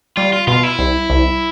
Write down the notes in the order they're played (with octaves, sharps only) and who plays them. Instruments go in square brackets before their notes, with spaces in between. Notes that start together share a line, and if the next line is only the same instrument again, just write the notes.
[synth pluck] G3 [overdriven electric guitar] F4
[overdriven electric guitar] F4
[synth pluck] B2 [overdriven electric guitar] F4
[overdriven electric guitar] E4
[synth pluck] C2
C2